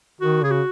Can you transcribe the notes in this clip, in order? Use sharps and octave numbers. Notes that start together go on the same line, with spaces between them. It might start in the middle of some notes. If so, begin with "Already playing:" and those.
D#3 F#4
C#3 G#4
F#4